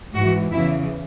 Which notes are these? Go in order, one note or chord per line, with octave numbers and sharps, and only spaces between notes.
G#2 E3 F#4
E2 C#3 E3 E4